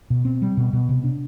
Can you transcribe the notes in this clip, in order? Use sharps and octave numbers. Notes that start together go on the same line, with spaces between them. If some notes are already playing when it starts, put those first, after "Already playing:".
B2
C4
G3
B2
B2
C3
D4